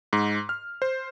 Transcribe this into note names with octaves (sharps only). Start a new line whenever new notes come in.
G#2
F6
C5